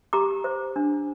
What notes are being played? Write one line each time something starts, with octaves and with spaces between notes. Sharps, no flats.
G4 A#5 D6
C5
D4